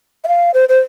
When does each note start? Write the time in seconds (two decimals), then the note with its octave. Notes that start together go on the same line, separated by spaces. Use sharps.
0.24 E5
0.28 F5
0.54 C5
0.69 C5